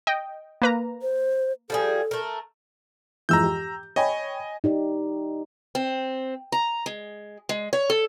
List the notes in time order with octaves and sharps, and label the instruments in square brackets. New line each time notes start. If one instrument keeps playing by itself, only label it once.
[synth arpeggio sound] D#5 G5
A#3 B4 A#5
[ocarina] C5
[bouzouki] F3 G3 G#4 [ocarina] A4
[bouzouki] A3 A#4
[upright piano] F2 G#2 E3 [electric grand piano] A#5 E6 G6
[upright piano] G4
[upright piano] C#5 G5 B5 [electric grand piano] D#5 G#5
[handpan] D#4 G4 D5
[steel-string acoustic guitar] C4
A#5
G#3
G#3
C#5
A4